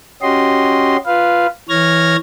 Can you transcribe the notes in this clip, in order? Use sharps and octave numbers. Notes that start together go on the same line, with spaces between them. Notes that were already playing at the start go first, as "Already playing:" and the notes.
C#4 F#4 G4 D#5 C6
F4 B4 F5
E3 C#5 F6 G#6 A#6